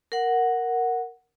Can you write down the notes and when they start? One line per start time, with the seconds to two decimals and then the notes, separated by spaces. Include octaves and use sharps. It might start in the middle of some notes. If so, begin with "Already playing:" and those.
0.12 A#4 F#5